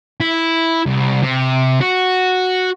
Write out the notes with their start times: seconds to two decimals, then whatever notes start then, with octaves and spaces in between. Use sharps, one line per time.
0.20 E4
0.87 C2
1.23 C3
1.81 F#4